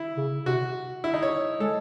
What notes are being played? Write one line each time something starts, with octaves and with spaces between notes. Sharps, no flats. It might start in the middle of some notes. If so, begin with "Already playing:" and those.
Already playing: E4
C#3
C3 F#4
E4
D#4
C#5
G#3 A4